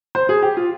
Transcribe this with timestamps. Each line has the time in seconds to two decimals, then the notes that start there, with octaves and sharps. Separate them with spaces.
0.15 C5
0.29 G#4
0.42 G4
0.57 F4